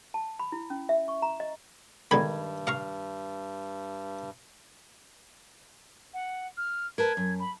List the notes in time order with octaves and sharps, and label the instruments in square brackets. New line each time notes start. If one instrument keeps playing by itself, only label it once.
[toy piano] A5
B5
E4
C#4
E5
C#6
A#5
D#5
[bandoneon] G2 [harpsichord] B2 D3 G#3 [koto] D#3 [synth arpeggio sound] B5 G#6
[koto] F5 [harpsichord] F#5 A#5 C#6
[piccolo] F#5
F6
[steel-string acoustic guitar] A#4 B4 A5 [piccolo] G#6
[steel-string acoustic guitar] F#2
[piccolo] B5